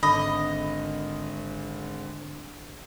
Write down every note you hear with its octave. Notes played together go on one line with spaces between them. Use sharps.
G#1 D3 D#5 B5